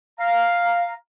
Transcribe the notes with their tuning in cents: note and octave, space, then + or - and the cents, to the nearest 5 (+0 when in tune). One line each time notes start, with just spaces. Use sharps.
F5 +0 A#5 -5